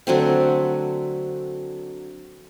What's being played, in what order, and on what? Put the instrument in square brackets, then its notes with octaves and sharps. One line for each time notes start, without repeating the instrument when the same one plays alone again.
[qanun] D3 F#3 A3 C4